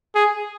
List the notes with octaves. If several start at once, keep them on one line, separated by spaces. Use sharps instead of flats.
G#4